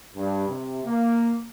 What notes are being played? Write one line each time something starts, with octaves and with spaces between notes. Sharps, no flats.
G2
C3
A#3